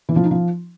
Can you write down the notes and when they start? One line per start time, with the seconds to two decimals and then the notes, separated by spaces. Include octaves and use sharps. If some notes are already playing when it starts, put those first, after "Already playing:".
0.09 E3
0.16 F3
0.24 D#4
0.31 F3